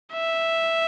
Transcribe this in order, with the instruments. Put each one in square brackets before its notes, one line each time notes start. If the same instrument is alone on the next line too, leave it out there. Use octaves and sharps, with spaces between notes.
[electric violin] E5